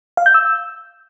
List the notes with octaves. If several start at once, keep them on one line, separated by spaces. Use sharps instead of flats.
F5
G6
E6